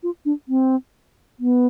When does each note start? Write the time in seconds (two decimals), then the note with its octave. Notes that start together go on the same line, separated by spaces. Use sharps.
0.03 F4
0.25 D4
0.48 C4
1.40 B3